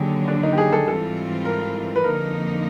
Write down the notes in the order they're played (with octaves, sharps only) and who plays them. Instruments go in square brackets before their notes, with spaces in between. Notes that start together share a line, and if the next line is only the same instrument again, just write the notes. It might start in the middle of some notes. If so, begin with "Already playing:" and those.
Already playing: [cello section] D#2 D3 F#3 [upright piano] G4 G#4
[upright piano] D4
D#4
G4
G#4
A4
[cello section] G#2 E3 G3 C4 F4 [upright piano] A4
[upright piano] A#4
B4
[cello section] F2 D3 F3 A#3 D#4 [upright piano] A#4